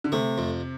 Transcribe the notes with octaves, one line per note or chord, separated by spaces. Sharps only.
D3
C3 A3
F2